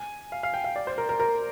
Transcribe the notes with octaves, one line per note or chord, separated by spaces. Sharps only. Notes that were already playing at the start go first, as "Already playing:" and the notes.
Already playing: G#5
F5
F5
G5
F5
D5
C5
A#4
A#4
A#4